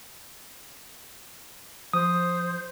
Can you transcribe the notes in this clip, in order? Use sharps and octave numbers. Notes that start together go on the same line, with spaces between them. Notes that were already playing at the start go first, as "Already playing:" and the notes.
F3 C5 D#6